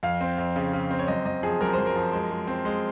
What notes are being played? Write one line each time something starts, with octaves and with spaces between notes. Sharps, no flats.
F2 F5
C4
F2
C#3
C#3
C4
C#5
F#2 D#5
F#2 D#5
F3 G#4
F#2 A#4
F#2 C5
A#4
F3
G#3
G#3
C4
G#3